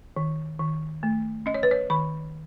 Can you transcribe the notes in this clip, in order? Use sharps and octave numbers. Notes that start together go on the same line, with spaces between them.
D#3
D#3
A3
C#4 D#5
C#5
B4
C#5
D#3 B5